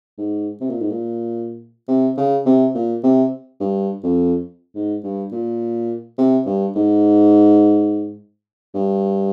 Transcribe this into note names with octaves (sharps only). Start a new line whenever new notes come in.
G#2
C3
A#2
G#2
A#2
C3
C#3
C3
A#2
C3
G2
F2
G#2
G2
A#2
C3
G2
G#2
G2